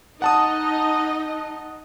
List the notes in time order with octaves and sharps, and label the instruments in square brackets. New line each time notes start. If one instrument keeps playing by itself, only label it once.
[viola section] D#4 D#5 [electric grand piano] F#5 A5 D#6